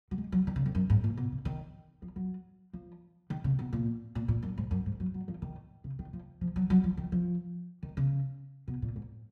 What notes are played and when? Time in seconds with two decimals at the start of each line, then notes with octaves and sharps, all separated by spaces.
0.11 F#3
0.18 G#3
0.32 F#3
0.47 D#3
0.56 C#3
0.66 F2
0.75 F#2
0.90 G#2
1.04 A#2
1.17 B2
1.32 C#3
1.45 D#3
2.02 F3
2.16 F#3
2.73 F3
3.30 D#3
3.44 C#3
3.59 B2
3.73 A#2
4.15 A#2
4.28 A#2
4.42 F#2
4.58 G#2
4.71 F#2
4.86 G#2
5.00 F#3
5.14 F#3
5.28 F3
5.42 D#3
5.84 C#3
5.99 D#3
6.13 F3
6.41 F3
6.56 F#3
6.70 F#3
6.84 F3
6.97 D#3
7.12 F3
7.83 D#3
7.97 C#3
8.68 B2
8.82 A#2
8.96 G#2